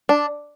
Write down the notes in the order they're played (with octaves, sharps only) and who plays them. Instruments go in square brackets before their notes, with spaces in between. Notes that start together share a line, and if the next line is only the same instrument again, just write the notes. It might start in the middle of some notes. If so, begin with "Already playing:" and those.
[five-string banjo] D4